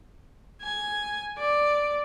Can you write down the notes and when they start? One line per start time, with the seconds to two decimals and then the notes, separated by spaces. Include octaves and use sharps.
0.62 G#5
1.38 D5